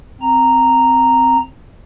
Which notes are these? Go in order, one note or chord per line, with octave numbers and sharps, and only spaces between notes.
C4 A#5